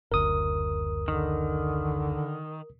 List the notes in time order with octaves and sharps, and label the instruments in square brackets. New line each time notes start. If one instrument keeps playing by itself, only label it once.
[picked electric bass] F#1 D2 [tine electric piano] A#4 D#6
[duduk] D3 [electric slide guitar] D#3